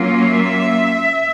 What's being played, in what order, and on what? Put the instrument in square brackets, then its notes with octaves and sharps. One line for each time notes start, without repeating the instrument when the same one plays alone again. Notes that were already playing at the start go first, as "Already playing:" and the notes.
Already playing: [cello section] F#3 A#3 C#4 F4
E5